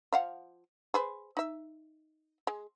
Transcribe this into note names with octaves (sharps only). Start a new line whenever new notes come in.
F3 F5 F#5
G#4 B4 C5
D#4 E5
G#3